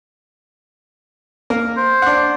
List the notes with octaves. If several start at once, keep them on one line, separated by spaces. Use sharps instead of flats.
A#3 A#4
C5
D4 F#5